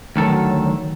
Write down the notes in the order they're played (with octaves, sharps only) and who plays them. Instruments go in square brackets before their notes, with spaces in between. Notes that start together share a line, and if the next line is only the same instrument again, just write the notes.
[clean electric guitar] D2 D#3 A4 [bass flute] F#3